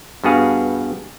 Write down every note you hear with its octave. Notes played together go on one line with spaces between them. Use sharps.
G2 B3 F#4 G#4 F5